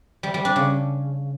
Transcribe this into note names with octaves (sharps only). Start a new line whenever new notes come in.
G3
G3
D4
C#3